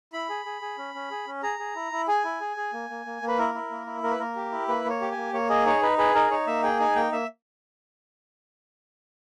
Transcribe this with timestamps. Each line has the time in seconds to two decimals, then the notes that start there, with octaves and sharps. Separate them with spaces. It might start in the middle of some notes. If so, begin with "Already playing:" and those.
0.13 E4 B5
0.30 G#4
0.45 G#4
0.62 G#4
0.78 C#4
0.95 C#4
1.11 G#4
1.27 C#4
1.43 G#4 A#5
1.59 G#4
1.75 E4
1.92 E4
2.08 G#4 G#5
2.25 E4
2.41 G#4
2.57 G#4
2.73 A#3
2.90 A#3
3.06 A#3
3.22 A#3
3.28 B4
3.38 E4 A#4
3.55 E4
3.71 A#3
3.86 E4
4.03 A#3 A#4
4.11 B4
4.19 A#3 A#4
4.36 G4
4.52 E4
4.68 A#3 B4
4.85 A#3 C#5
5.01 G4
5.12 G#5
5.17 A#3
5.33 A#3 C#5
5.49 G#4 D#5
5.66 D#4 C#5
5.82 D#4 B4
5.98 G#4 B4
6.15 D#4 A#4
6.31 D#4 C#5
6.47 A#3 E5
6.63 G#4 G5
6.79 D#4 G#5
6.96 A#3 G5
7.12 A#3 E5